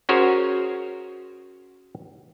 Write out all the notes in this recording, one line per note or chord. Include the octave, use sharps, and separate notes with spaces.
C#4 F#4 G#4 A#4 C5 C#5